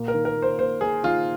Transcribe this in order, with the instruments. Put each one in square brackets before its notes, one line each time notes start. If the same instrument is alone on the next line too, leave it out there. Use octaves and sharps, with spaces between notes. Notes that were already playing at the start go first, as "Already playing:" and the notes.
Already playing: [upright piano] A#2 A#3
[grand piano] A#4
[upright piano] D#3
[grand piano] A#4
[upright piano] A#3
[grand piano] C5
[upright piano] A#3 [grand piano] C5
[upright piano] A#3 [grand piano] G#4
[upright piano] D#3 [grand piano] F4